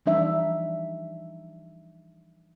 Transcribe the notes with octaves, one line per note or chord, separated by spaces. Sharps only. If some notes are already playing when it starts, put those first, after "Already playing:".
E3 F3 G3 D4 D#4 E5